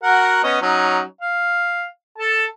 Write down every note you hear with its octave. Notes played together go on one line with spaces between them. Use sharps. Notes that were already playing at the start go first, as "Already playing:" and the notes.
F#4 A#4 F#5
B3 C#4 D#5
F#3 C#4 D#4
F5
A4 A5